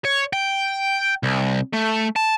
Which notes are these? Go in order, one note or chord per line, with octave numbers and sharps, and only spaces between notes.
C#5
G5
C2
A3
A5